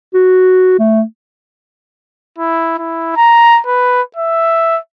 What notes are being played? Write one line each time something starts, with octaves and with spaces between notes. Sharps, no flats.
F#4
A3
E4
E4
A#5
B4
E5